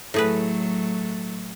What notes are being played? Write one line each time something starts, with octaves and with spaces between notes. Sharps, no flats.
A2 F#3 A3 G#4 B4